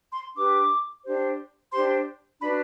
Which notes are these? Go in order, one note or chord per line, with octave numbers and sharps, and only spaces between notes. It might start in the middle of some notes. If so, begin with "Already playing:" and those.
C6
D4 G4 B4 D6
D4 G4 C5
D4 G4 C5 C6
D4 F#4 B4 B5